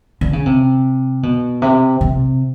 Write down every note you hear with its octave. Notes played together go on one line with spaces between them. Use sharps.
D3
C#3
C3
B2
C3
C3